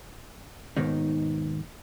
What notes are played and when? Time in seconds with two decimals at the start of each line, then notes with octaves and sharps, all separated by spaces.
0.77 D#2 G#2 B2 D#3 D#4